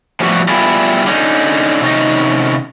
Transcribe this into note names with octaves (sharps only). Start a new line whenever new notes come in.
A2 F3 G3 B3 F#4 G4
G3 B3 E4 F4 G#4
D3 C#4 D#4
C3 D#3 C#4 D#4 D#5